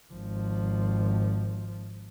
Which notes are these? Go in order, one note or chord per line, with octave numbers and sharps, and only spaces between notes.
G#1 F3